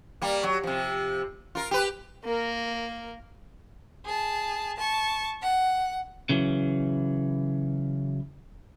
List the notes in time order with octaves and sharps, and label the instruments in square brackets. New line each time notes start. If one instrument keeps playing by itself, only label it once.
[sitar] G3 A#3
F#3
C3 F3
F4 A#4
G4 B4
[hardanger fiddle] A#3 A#4
[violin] G#4 A5
A5 C#6
F#5
[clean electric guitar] C#3 E3 F#3